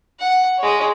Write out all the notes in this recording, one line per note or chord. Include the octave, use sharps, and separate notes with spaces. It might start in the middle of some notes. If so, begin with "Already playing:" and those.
F#5
G#3 C#5